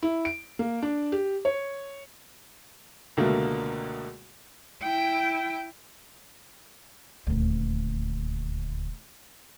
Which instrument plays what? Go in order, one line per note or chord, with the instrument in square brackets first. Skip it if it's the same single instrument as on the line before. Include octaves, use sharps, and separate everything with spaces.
[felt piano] E4
D7
A#3
D4
G4
C#5
[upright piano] C#2 B2 D3 A3 A#3
[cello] E4 G5
[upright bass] D#1 D2